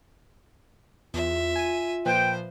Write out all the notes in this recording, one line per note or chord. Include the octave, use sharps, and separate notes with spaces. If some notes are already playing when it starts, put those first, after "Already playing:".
E2 F4 E5
G#5 D#7
A#2 F3 B4 C5 G5